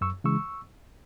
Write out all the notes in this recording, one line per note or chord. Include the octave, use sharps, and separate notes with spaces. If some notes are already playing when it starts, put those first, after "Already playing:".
F#2 C#6 E6
C#3 E3 G#3 C#6 E6